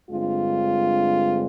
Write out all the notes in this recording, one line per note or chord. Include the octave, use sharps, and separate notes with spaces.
G2 D3 G#3 C4 F4